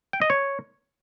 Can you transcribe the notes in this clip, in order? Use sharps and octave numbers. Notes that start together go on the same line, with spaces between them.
G5
D#5
C#5